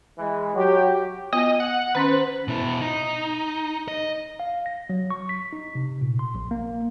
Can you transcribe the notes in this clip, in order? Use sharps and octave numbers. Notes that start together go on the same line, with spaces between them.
E3 G#3
F#3 F#4 G4
B3 F4 D#5 G#5
F#5
D#3 C#4 B4 C6
C5
B2 E4
D#4
D#5
F5
A#6
F#3
C#6
B6
D#4
C3
A#2
C6
A#1
A#3